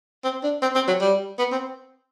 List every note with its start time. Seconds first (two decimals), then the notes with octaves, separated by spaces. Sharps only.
0.24 C4
0.43 D4
0.62 C4
0.75 C4
0.88 F#3
1.01 G3
1.39 B3
1.52 C4